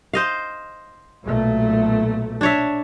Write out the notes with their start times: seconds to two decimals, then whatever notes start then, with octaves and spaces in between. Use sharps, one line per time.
0.14 C5 D#5 F5
1.25 B1 A#2 A3
2.41 D4 C#5 E5